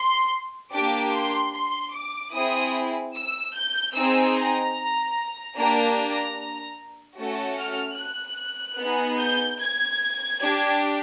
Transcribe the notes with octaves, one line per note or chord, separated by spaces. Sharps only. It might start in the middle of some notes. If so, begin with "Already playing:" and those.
Already playing: C6
A#3 D4 G4 D6
C6
C6
D6
C4 E4 G#4 D#6
E6
G6
C4 D#4 G#4 E6
A#5
A#3 D4 G4 A#5
A3 C#4 F#4 A4
F6
F#6
B3 D#4 G#4
G6
G#6
D4 G4